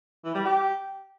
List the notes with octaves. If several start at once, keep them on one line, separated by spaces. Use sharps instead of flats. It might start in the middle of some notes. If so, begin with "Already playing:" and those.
E3
G3
G4